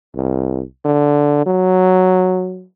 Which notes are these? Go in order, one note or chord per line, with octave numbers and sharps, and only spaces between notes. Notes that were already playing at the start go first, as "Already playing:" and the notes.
C2
D3
F#3